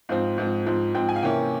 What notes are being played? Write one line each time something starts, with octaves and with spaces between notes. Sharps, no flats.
G#2 F3 C4 F5
G#2 F3 C4
G#2 F3 C4
G#2 F3 C4 G5
G#5
F5
C3 E3 A#3 C#4 G5